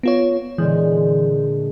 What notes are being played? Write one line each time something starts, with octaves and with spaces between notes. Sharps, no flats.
B3 F4 C#5
A#2 D3 E3 G#3